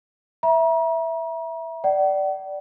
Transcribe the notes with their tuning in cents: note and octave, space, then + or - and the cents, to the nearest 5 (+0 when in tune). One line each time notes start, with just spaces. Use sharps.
E5 +0 A#5 +40
D5 +0 F#5 +45